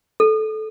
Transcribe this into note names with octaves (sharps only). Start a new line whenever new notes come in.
A4